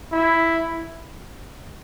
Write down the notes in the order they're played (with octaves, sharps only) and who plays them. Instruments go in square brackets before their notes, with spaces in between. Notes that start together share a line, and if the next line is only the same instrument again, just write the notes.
[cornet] E4